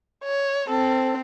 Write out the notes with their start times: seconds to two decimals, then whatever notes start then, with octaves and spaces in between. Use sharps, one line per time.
0.24 C#5
0.69 C4 A4